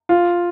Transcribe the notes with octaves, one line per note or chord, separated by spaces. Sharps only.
F4